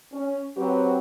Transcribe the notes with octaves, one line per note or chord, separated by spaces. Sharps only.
C#4
F#3 C4 F#4 G4 B4 C#5